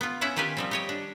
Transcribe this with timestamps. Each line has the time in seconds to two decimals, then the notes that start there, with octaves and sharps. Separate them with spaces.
0.01 B3 F4
0.21 C#4 E4 E5 F#5
0.36 D#3 F4 G4 B4 G#5
0.57 F3 G3 C4
0.71 G4 C#5 D#5
0.89 D4